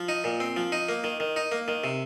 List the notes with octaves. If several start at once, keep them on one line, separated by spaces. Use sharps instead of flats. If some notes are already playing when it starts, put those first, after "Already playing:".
Already playing: F3
D#4
A#2
C4
F3
D#4
A#3
D#3
D#3
D#4
A#3
D#3
C3